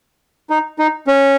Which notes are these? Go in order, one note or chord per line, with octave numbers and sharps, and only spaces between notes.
D#4
D#4
C#4